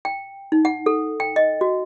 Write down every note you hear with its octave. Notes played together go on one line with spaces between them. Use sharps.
G5
D#4
F#5
A4
G5
D#5
F#4